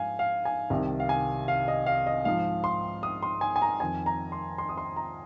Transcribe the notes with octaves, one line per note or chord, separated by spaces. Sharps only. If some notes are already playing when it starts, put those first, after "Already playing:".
Already playing: G#2 F3 F5 G#5
F5
G#5
C2 C3 D#3
F5
G#5
F5
D#5
F5
D#5
G#2 F3 F5
C6
D#6
C6
G#5
G#5
A#5
F2 D#3 G#5
A#5
C6
C6
D#6
C6
A#5